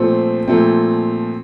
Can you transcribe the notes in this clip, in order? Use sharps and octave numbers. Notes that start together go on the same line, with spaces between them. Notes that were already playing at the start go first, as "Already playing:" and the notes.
Already playing: A#2 F3 A3 C4 C5
A#2 F3 A3 C4